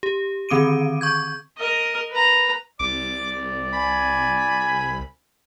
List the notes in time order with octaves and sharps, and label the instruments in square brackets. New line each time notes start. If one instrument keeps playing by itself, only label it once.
[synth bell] G4
D3 D#3 C4 D6 D7 D#7
C#6 G6 G#6
[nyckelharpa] A#4 D#5
B4 A#5
[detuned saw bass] C2 [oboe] D5 [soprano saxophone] D6
[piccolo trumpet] G#5 [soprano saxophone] B5